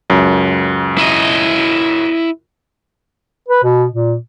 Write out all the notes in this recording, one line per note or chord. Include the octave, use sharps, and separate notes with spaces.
C#2 F#2
E4 D#5
B4
B2
A#2